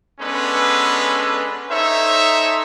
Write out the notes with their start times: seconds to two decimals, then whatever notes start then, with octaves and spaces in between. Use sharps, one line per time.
0.20 G#3 B3 C#4 D4 A4 B4
1.70 D#4 A4 C5 C#5 E5